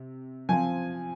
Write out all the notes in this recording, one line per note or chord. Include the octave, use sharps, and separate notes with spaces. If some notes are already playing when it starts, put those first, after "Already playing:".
Already playing: C3
F3 C4 G#5